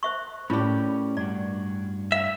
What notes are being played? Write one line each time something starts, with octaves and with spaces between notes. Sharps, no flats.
C5 E5 C#6
A2 C#4 F4 G4 A#4 D5
G2 D4 F#4 D5
E5 F5